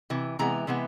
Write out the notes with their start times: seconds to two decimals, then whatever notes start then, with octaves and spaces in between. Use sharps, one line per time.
0.10 C3 E3
0.39 C3 E3 G#3 B3 A#5
0.67 C3 E3 G#3 B3